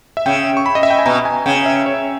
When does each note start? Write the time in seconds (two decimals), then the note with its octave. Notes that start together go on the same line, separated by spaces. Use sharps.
0.17 E5
0.26 C#3 G5
0.57 C#6
0.66 B5
0.75 D#5
0.83 E5
0.90 G5
0.99 G#5
1.06 B2 A#5
1.25 G#5
1.46 C#3 G5
1.66 E5
1.86 C#5